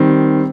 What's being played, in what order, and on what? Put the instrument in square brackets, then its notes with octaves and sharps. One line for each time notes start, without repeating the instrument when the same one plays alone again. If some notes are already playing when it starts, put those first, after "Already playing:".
Already playing: [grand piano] D#3 G3 C4